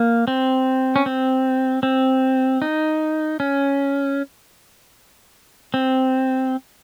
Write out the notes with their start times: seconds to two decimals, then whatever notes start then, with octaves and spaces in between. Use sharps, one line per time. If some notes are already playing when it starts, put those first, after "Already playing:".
Already playing: A#3
0.28 C4
0.96 C#4
1.06 C4
1.83 C4
2.62 D#4
3.40 C#4
5.74 C4